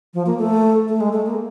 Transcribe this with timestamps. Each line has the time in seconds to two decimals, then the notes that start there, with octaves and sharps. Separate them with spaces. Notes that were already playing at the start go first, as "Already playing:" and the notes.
0.14 F3
0.26 A#3
0.39 A3
0.88 A3
1.01 G#3
1.13 A3
1.26 A#3